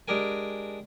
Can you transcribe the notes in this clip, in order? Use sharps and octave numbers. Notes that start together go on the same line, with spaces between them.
G#3 D4 G4 A#4 G#5